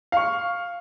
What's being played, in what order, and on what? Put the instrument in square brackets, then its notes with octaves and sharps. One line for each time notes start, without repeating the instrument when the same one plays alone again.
[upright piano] F5 C#6